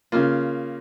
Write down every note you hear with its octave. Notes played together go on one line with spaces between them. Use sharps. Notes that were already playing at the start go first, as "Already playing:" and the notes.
C#3 A#3 F4